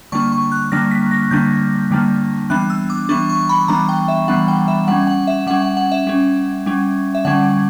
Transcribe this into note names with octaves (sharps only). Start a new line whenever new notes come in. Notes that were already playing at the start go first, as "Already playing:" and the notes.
D3 G3 A#3 D4 C#6
C#6
F#6
D3 G3 A#3 D4 A#6
B6
A#6
D3 G3 A#3 D4 G6
D3 G3 A#3 D4
E3 G3 B3 D4 F#6
E6
D6
E3 G3 B3 D4 C#6
C#6
B5
E3 G3 B3 D4 A#5
G5
E5
E3 G3 B3 D4 F#5
G5
E5
G3 C#4 F#5
F#5
E5
G3 C#4 F#5
F#5
F#5
E5
G3 C#4
G3 C#4
E5
D3 G3 C#4 F#5